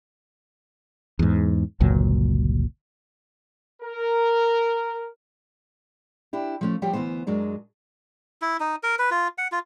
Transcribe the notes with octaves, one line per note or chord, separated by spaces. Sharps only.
E2 G#2
G1 C#2 A#2 F#3
A#4
D4 E4 G4
F3 A3 C#4
F3 G3 F#4 G4 C#5
D2 G2 E3 B3 C5
F#2 F#3 G#3 D4
E4
D#4
A#4
B4
F4
F#5
F4